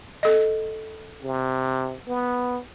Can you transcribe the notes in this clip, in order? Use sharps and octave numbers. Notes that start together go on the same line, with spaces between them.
A4 D#5
C3
B3